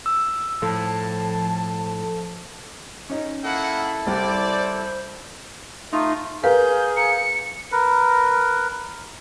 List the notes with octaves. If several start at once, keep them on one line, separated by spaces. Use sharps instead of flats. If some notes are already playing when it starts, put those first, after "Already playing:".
E6
A2 F3 A4 A5
C#4 D#4
A#3 E4 A4 E5 F#5 E6
C2 G4 C5 D5
A3 D#4 F4
G#4 A#4 B4 F5 G6
A#5 C#7
A#4 B4